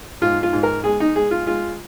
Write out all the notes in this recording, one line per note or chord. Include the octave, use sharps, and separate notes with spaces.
G#2 F4
F4
G#2
A#4
G#3 G#4
D#4
G#3 G#4
F4
G#3 F4